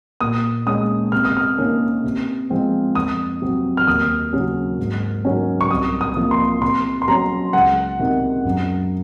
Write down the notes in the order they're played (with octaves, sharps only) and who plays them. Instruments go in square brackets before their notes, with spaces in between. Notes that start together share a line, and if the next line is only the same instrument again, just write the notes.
[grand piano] A#2 D#6
G#3 C#4 D#6
C3 F6
D#6
F6
D#3 A#3 C#4
C3
F3 G#3 C4
F2 D#6
C3 F#3 C4
F6
D#2 D#6
C#3 F#3 C#4
G#2
D#3 F#3 C#4
C#6
C2 D#6
D#6
C3 F3 A#3
C6
C3 C6
C6
F#3 C#4 A#5
C#2 F#5
C3 D#3
F#2